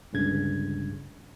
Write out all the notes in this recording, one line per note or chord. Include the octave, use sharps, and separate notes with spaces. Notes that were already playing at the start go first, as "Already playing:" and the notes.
G1 C#2 G2 C#3 G#6